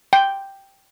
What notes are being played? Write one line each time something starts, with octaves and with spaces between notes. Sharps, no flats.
G5